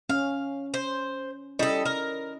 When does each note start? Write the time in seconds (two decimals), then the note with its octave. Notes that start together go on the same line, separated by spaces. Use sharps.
0.09 C#4 F5
0.74 C5
1.59 G3 C#4 E4 A4 D#5
1.85 A#4